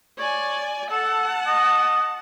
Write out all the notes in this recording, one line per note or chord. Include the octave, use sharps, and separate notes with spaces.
C#5 D5 G#5
A4 F#5 A5
D#5